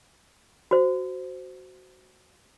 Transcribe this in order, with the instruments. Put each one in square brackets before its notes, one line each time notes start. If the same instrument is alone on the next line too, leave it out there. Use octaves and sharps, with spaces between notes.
[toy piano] F#4 C5